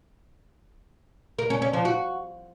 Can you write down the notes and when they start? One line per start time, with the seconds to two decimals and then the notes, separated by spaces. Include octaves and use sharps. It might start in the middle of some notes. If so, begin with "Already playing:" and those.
1.39 A#4
1.50 C#4
1.62 C#4
1.73 F3
1.85 F#4